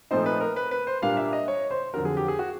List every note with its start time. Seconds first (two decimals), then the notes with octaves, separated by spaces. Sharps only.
0.11 A#2 F3 A3 C4 D#4 C5
0.26 B4
0.41 A#4
0.56 B4
0.71 B4
0.87 C5
1.02 A#2 G3 A#3 D4 F5
1.17 E5
1.33 D#5
1.48 C#5
1.71 C5
1.94 F2 D3 F#3 A#4
2.05 G#4
2.17 G4
2.28 G#4
2.39 F#4